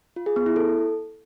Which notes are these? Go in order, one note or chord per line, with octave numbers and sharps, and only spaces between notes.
F4
G#4
B3
E4
A4